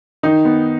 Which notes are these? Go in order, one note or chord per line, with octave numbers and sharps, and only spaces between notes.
D#3 D#4
B3